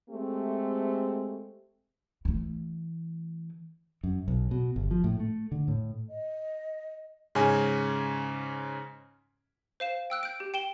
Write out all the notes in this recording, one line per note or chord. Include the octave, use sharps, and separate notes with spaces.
G#3 A3 C4 G4
E3 A3
F#2
B1
B2
G1
F3
A2
A3
D3
A2
D#5
G#2 C#3 C#4 G#5
C5 F5 E7
G5 E6 F#6 D7
G6 D7
G4
G5 E7 G7